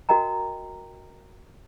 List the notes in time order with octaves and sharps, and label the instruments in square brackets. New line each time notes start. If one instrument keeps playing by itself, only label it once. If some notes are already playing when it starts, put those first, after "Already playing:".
[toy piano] F#4 A#4 D#5 G5 A#5